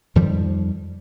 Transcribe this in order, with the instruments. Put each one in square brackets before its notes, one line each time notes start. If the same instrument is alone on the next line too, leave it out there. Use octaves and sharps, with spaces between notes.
[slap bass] F2 D#3 F3 G3